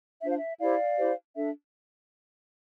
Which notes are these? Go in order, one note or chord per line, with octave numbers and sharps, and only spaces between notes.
D4 F4 C5 E5
F5
E5
E4 G4 C5 D5 F5
E4 G4 C5
D4 A4 E5